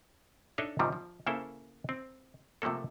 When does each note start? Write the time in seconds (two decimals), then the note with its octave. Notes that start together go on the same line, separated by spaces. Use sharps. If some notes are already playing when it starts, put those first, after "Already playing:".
0.58 D4 D#4 A4 C#5 D#5 E5
0.79 G#2 C3 D#3 F3 G3
0.93 F3
1.26 C#3 A#3 E4 A4 C5 E5
1.89 C4
2.62 C3 F3 A3 A#3 A4